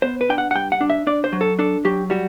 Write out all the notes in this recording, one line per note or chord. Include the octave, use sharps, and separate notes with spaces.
B3 C5
B4
D4 G5
F#5
F#5
G2 G5
F#5
D4
E5
D4 D5
C5
F#3
A4
D4 A4
F#3 G4
G3 F#4